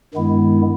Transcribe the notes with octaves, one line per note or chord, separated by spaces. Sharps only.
G2 D#3 G#3 B3 E4